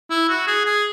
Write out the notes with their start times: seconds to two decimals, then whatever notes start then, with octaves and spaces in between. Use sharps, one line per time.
0.11 E4
0.29 F#4
0.47 G#4
0.66 G#4